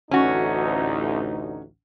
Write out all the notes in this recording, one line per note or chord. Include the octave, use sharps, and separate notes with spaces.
A1 D2 C#4 D#4 F#4